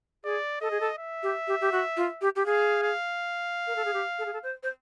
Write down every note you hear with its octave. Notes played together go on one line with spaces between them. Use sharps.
G#4 D5
A4 D#5
G#4
A4
E5
G4
G4
G4
F#4
F4
G4
G4
G#4 F5
F5
A#4
A4
G#4
G4
A4
G#4
A4
C5
C5